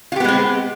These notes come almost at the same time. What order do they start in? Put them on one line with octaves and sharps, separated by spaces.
F4 G4 B3 G#3 C4